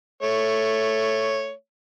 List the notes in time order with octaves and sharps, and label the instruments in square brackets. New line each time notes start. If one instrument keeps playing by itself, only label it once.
[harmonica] A3 C#5